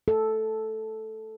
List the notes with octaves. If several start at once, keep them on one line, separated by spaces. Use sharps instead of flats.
A4